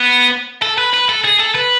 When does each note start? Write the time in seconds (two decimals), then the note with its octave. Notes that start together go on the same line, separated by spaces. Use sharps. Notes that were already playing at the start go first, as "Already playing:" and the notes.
Already playing: B3
0.62 A4
0.78 B4
0.93 B4
1.09 A4
1.25 G#4
1.40 A4
1.55 B4